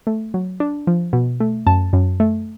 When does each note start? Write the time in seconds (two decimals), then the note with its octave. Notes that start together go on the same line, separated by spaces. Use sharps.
0.07 A3
0.34 F#3
0.60 D4
0.87 F3
1.13 B2
1.40 A3
1.66 F#2 A5
1.93 F#2
2.20 A3